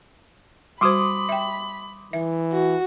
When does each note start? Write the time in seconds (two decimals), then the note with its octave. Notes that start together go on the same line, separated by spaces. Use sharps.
0.81 G3 F#4 C5 B5 C6 D6 D#6
1.29 E5 G5
2.13 E3 E5
2.52 F#4